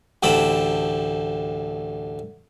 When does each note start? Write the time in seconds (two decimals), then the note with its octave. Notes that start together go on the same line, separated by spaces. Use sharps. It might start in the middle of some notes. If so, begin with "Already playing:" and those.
0.23 A1 D2 G4 A4 C5 B5